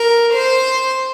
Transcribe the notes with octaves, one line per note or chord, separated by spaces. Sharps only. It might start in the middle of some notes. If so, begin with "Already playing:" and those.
Already playing: A#4
C5